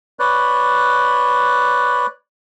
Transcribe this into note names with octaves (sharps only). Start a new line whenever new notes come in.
B4 C#5 D5 F#6